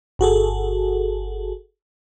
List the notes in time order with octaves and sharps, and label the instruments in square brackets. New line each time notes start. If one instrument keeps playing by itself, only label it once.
[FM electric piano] G1 F#4 G#4 A4